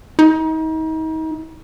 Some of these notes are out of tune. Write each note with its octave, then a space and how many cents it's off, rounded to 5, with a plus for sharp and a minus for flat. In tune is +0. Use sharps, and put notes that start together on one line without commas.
D#4 +35